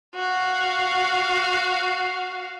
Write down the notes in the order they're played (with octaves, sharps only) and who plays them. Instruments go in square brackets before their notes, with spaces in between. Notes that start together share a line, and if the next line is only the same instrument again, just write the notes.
[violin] F#4 F5